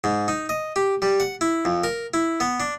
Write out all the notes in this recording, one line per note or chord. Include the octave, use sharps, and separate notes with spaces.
G#2
D#4
D#5
G4
G3
F#5
E4
F2
A#4
E4
B3
D4